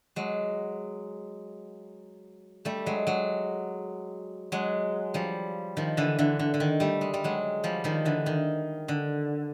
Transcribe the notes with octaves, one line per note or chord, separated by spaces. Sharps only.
F#3 G#3
G3 A3
F#3 G#3
F#3 G#3
F#3 G#3
F3 G3
D#3 F3
D3 E3
D3 E3
D3
D3
D#3
G3 A3
G#3
G3
F#3 G#3
F3 G3
D#3 F3
D3 E3
D#3
D3